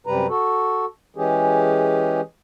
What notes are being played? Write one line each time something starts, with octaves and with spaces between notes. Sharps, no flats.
F#2 C3 G3 B4 A#5
F#4 A4
E3 G#3 C#4 G4 G#4